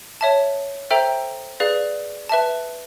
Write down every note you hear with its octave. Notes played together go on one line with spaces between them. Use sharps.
C#5 E5 A5
A4 C5 E5 G5 A#5
G#4 B4 D5 F5
B4 E5 A5